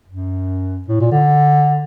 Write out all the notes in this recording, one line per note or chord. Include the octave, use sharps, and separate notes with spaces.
F#2
A2
A#2
D3